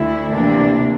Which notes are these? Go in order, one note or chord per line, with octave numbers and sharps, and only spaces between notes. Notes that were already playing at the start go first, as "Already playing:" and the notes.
Already playing: D2 D3 A3 E4
D2 C3 E3 A#3 D4